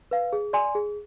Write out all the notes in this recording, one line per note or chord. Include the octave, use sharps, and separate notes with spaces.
B4 F5
G#4
D5 G#5 C6
G#4